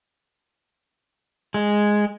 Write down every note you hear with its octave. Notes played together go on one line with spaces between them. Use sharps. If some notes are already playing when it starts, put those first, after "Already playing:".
G#3